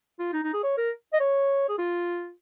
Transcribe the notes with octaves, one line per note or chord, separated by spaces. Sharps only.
F4
D#4
D#4
G#4
C#5
A#4
D#5
C#5
G#4
F4